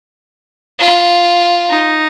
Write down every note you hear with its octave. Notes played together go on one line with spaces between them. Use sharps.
F4
D#4